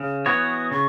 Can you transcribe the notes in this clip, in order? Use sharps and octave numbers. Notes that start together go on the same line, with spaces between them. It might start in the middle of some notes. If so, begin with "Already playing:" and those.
Already playing: C#3
E3 B3 F#4 C#5 D#6
C#3 C#6